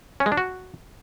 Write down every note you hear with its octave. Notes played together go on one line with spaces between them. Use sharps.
C#4
G#3
D4
F#4